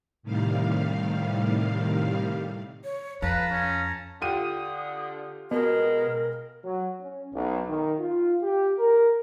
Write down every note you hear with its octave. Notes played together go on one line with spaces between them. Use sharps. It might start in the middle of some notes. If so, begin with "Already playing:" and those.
A2 C3 D#3 G3 F5
C#5
F2 B4 F5 A5 A#5
C#4
D3 F4 G4 D#6 D#7
B2 G#3 A#4
F#3
C#4
B1
D#3
F4
G4
A#4